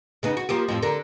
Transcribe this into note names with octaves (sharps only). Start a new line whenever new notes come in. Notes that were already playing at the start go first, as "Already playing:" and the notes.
C#3 B3 D#4
F#4
F3 A#3 G4
F2 A2 F3
D3 A#4